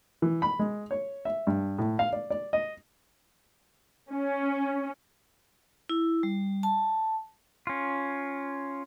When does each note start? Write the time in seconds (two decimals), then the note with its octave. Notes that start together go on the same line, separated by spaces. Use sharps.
0.22 E3
0.42 B5
0.59 G#3
0.91 C#5
1.25 E5
1.47 G2
1.78 A2
1.99 F5
2.13 D5
2.30 D5
2.53 D#5
4.10 C#4
5.90 E4
6.23 G3
6.63 A5
7.67 C#4 F4